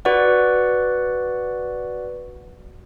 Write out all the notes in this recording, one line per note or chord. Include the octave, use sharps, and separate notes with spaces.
F#4 B4 D5 F#5